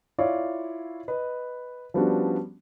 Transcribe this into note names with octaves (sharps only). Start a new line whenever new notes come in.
E4 F4 C#5 D5 F5
B4 D#5
F3 G3 B3 C#4 D4 F#4